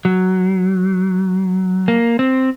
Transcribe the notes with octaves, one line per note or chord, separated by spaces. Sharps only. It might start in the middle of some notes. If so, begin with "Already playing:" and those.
F#3
A#3
C4